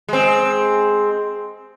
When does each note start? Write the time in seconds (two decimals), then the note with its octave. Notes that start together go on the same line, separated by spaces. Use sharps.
0.09 G#3 C4